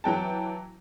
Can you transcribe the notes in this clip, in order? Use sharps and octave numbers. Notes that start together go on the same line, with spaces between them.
E3 F#3 G5 A5